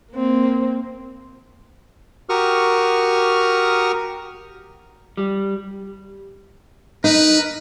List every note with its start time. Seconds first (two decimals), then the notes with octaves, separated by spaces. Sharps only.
0.12 A#3 C4
2.29 F#4 G4 A#4 C#6 D#6 F6
5.17 G3
7.04 D#4 A#4 B4